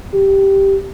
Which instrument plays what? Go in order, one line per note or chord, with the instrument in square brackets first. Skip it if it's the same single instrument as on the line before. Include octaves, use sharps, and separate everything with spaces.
[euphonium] G4